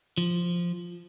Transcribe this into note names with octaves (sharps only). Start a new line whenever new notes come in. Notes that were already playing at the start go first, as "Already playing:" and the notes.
F3